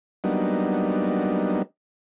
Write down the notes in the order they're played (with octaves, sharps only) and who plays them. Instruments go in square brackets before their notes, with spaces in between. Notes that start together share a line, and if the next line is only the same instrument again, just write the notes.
[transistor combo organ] F#3 G3 A#3 B3 D4 D#4